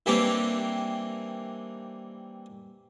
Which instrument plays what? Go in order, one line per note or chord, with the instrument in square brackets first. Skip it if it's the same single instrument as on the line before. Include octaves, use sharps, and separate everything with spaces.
[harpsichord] D#3 E3 G3 A#3 C4 D4